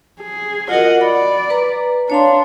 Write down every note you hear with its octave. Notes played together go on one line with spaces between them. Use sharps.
G#4
F4 F#4 A#4 D#5 F#5
D5 B5
B4 A#5
D4 C#5 F5 C6